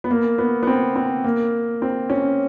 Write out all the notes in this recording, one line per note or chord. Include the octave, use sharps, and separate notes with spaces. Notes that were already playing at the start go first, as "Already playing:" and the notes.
B3
A#3
B3
B3
C4
C4
A#3
C4
C#4